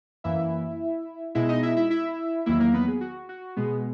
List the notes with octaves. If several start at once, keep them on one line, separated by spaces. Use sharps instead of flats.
F#2 E3 A#3 E4 E5
B2 G#3 B3 E4 E5
D#4 D#5
E4 E5
E4 E5
E4 E5
E2 D#3 F#3 A#3 E4 E5
A#3 A#4
B3 B4
G#4
F#4
F#4
B2 G#3 B3 G#4